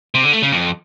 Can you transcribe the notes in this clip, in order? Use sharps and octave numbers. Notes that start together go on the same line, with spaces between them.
C3
D3
A3
C#3
F2